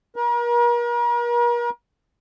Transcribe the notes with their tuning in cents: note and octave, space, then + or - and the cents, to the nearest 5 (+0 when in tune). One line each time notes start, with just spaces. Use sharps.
A#4 +40